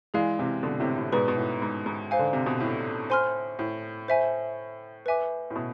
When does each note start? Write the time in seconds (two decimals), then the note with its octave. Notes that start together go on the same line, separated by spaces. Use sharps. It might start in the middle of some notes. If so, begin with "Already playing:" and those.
0.14 E3 G#3 G#4 D5 F5
0.39 C3 E3
0.63 B2 D3
0.80 A2 C3
0.96 A2 C3
1.12 G#2 B2 G#4 B4 D5
1.28 B2
1.37 A2
1.62 G#2
1.86 G#2
2.11 C5 F5 G#5
2.19 D3
2.33 C3
2.46 B2
2.60 A2
3.10 C5 G#5 C6 F6
3.59 A2
4.08 C5 E5 G#5
5.06 B4 E5 G#5 D6
5.50 A2
5.56 B2